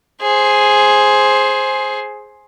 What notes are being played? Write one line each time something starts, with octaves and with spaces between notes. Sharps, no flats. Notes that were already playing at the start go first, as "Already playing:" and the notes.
G#4 C5